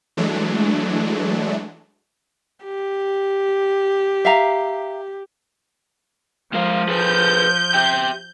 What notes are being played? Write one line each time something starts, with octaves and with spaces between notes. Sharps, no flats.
E3 F#3 G#3 A3 D4
G4
E5 F5 A#5
F3 G#3 A#4 F5
G#4 A4 B4 G6
G4 E5 G5